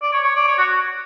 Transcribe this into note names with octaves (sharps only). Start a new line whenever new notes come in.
D5
C#5
C#5
D5
C#5
F#4